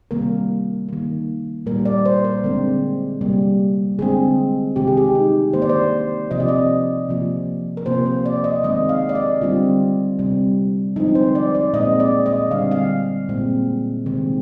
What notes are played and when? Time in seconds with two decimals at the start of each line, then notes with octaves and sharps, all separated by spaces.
0.11 C3 D#3 G3 A#3 A#4
0.89 D#3 A#3
1.66 A#2 G3 A#3 A#4
1.85 D5
2.05 C5
2.25 A#4
2.44 D3 G#3 C4
3.21 C3 G3 A#3
3.99 D3 G#3 C4 G#4
4.76 C3 D#3 G#3 C4 G4
4.87 G#4
4.97 G4
5.15 D#4
5.53 D#3 A#3 C5
5.62 D5
5.69 C5
6.31 C3 F3 C4 D#5
6.40 D5
6.48 D#5
7.09 C3 F3 A#3
7.77 A#4
7.86 C3 F3 A#3 C5
8.06 C5
8.26 D5
8.44 D#5
8.63 D#3 G#3 C4 D#5
8.89 F5
9.09 D5
9.15 D#5
9.41 D3 G3 C4 F4
10.19 C3 G3 C4
10.96 D3 F3 G#3 C4 D#4
11.15 C5
11.35 D5
11.55 D5
11.73 A#2 G#3 C4 D#5
12.00 D5
12.26 D#5
12.51 D3 G3 C4 F5
12.71 F5
13.29 A#2 G#3 C4
14.06 C3 D#3 G#3 C4